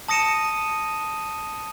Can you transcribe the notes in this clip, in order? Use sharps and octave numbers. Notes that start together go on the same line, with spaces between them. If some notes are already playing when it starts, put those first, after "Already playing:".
A5 D#6 A#6 C#7 D#7 E7